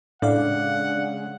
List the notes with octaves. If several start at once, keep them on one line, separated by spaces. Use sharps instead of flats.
A2 C#3 G#3 D4 D5 F5 F#5